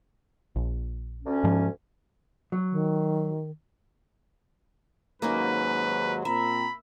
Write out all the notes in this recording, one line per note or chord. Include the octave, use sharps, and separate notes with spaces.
A#1
D2 C#4
G#2 F3
F#3
D#3
D#2 G#2 F#3 A#3 C#4 D#4 B4
A#2 C4 E5 A#5 B5